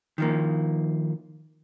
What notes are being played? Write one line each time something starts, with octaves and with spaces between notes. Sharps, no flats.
D#3 F3 A#3